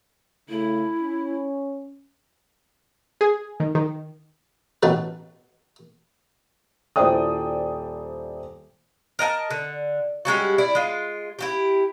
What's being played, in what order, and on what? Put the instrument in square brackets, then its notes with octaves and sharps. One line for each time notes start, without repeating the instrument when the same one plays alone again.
[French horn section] C#3 A3 [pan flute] E4
[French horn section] C#4
[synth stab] G#4
D#3
D#3
[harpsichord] A1 B2 F#3 A4
[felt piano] D#1 E4 C5 D5 G5 D#6
[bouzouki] A#4 D#5 F#5 A5
D3
G3 G#3 C#4 F#4
E4 D5
G#3 F4
E4 F#4 G4